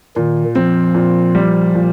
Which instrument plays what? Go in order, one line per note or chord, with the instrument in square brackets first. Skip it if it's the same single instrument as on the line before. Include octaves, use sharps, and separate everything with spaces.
[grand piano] A#2 [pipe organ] D#3
[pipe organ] F3 [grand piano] C4
[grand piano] A#2
G3
A#2